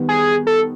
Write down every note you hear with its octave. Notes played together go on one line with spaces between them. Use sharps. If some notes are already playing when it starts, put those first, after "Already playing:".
Already playing: D#3 G3 B3
G#4
A4